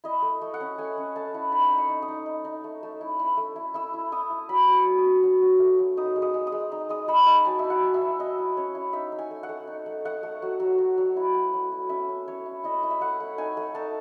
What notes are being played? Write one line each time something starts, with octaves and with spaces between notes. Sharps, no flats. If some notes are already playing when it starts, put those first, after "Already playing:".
E4 D#5
A3
A3
F#5
C#4
A3 G#5
C#4
A3 A5
E4
D#4 B5
D#4
C#6
D#4
D#6
D#4
D#4
D#4
A3
A3
E4
E4
A3
E4
E4 E6
E4
E4 D#6
E4
F#3 B5
F#3
C#6
F#3
D#6
C#4
F#3
F#3
A3
F#3
D#4 D#6
G#3
D#6
G#3
D#6
G#3
D#4
G#3 D#6
G#3 B5
D#4 A5
F#3 G#5
E5
E4
F#5
F#3
E5
F#3
E4 D#5
E4
C#4 C#5
E4
D#4 E5
D#4
G#5
A3
F#5
A3
D#4
A3
A3 F#5
A3
F#3
F#3
F#3
F#3
E4
B3
F#3
E4
C#4 E5
C#4
A3 C#5
E4
E4 D#5
E4
E5
A3 F#5
A3
D#4 G#5
A3
D#4 A5